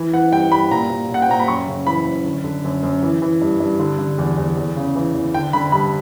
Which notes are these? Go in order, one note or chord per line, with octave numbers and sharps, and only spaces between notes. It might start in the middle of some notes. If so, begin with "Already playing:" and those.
Already playing: E3
E3 F#5
G2 G5
G2 B5
A#2 A#5
A#2
A#2 F#5
G5
A#2 A#5
B5
F#2 C#6
C#3
E3 B5
F#2
D3
D3
F#2
F#2
E3
E3
G2
G2
D3
D3
E2
E2
E2
C#3
E3
E2
D3 G5
D3 B5
G2 B5